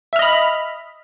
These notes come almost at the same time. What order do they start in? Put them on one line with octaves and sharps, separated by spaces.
E5 F6 D#5 B5